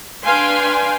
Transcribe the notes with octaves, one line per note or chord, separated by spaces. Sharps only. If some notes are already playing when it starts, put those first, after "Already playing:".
D4 B4 F5 G5 G#5 C6